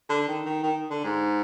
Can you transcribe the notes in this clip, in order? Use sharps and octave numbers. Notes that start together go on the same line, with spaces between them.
D3
D#3
D#3
D#3
D3
G#2